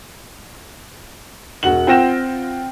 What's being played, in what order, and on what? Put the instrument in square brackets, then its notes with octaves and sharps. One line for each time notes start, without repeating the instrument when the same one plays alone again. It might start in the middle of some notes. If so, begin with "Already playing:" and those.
[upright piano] E1 F#4 F#5 F#7
C4 F4 F#5 G5 A#6 E7